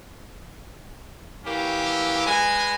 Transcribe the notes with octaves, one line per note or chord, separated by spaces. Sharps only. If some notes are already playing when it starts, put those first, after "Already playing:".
E3 A#3 C#4 G4
G#3 B4 G#5